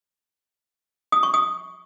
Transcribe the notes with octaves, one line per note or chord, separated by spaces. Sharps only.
D#6
C#6
D#6